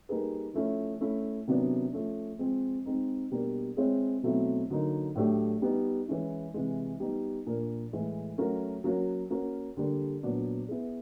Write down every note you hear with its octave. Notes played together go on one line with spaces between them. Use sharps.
G3 A#3 D#4 G#4 B4
F3 A3 C#4 E4
A3 C#4 E4
C3 D#3 F#3 B3 D4
F3 A3 C#4
F3 G#3 C4
G#3 C4 D#4
B2 G3 A#3 D4
G#3 C4 E4 G#4 C#5
B2 F#3 A3 C4 E4
D3 F#3 A#3 D#4
A2 F#3 A3 D4 G4
G3 B3 D#4
E3 G#3 C#4 E4
C3 E3 G#3
G3 B3 D#4
A#2 F3 A#3 D4
A2 E3 G#3
F#3 A3 C#4 F#4 A#4
F#3 A#3 C#4 F#4
A#3 C#4 F#4 A#4
D3 G3 A#3 D4
A#2 F#3 B3 D4
B3 E4 G#4